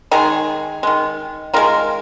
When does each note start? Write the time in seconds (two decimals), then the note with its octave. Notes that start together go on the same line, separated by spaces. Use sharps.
0.11 D#3 G#3 D#4 G#4
0.83 D#3 G#3
1.53 D#3 G#3 F4 A#4